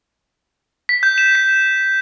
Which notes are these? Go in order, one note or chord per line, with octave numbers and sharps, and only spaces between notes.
B6
G6
E7
B6